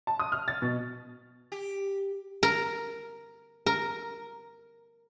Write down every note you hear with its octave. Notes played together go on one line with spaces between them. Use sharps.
A5
D#6
F6
A6
B2
G4
A#4
A#4